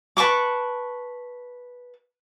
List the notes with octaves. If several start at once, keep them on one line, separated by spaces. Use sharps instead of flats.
B4 A5 C#6 D6